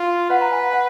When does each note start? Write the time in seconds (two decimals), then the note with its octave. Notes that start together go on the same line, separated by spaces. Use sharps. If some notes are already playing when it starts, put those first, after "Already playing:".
Already playing: F4
0.30 B4 F#5
0.41 A#5
0.52 G#5
0.62 F#5
0.73 F#5